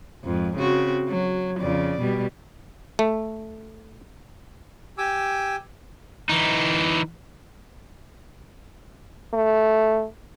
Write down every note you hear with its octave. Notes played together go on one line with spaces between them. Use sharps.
F2 G#2
C#3 C4 F#4
F#3
F2 C#3 D5
B2 G3
A3
G4 G#5 D6 E6
E3 D#4
A3